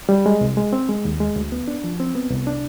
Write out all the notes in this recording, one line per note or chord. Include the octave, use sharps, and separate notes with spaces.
G3
G#3
C2
G#3
C4
G#3
D#2
G#3
D2
B3
D4
F3
C4
B3
C2
D4